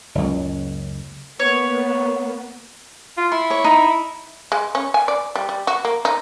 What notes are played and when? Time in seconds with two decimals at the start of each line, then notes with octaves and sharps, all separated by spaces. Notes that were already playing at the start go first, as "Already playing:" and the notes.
0.15 F#1 C#2
1.40 A#3 B3 C#5
3.17 F4
3.32 E4 C6
3.50 C#5
3.64 D#4
4.52 G#3
4.75 C#4
4.94 G#5
5.08 D5
5.35 G3
5.49 G3
5.67 F#4
5.85 A#3
6.05 D#4